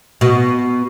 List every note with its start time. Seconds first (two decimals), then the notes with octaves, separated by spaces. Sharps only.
0.21 B2